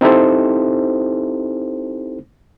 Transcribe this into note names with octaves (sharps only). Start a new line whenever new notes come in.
C4 D#4 E4 G4 A4 C5